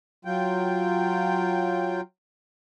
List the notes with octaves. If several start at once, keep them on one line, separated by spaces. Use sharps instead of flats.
F#3 F4 G5